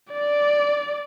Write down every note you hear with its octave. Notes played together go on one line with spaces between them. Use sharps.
D5